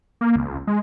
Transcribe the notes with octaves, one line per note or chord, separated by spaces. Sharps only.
A#3
C#2
G#3